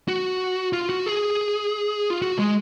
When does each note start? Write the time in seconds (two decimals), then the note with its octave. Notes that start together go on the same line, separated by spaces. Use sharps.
0.08 F#4
0.73 F4
0.89 F#4
1.06 G#4
2.10 F4
2.22 F#4
2.39 G#3